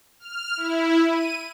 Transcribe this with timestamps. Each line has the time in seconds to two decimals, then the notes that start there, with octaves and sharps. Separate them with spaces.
0.19 F6
0.57 E4
1.08 D#7